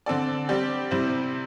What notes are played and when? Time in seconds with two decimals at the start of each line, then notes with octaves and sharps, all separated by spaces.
0.06 D3 C4 A4 D5
0.49 G3 C4 G4 D5
0.91 C3 G3 C4 E4 C5